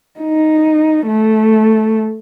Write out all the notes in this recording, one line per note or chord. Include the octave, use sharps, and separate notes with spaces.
D#4
A3